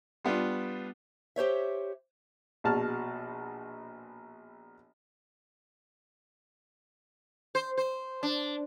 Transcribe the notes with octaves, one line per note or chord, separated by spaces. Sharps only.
G3 B3 D4 F4
G4 C5 C#5 E5
A#1 B2 F#4 A5 F6
C5
C5
D4